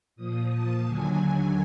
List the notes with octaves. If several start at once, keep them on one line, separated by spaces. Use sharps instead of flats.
A#2 F3 D#6
A5
D#2 D3 F#3 G#5